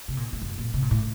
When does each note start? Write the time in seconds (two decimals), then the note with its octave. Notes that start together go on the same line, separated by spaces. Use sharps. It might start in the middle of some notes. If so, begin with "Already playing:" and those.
0.08 C3
0.17 A#2
0.33 A2
0.42 F#2
0.58 A#2
0.74 C3
0.82 A#2
0.91 A2